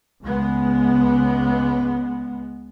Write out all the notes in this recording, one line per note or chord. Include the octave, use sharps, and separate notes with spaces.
C#2 G#3 B3